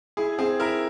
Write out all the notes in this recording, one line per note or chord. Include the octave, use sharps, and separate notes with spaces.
E4 G#4
C4 G#4
E4 A#4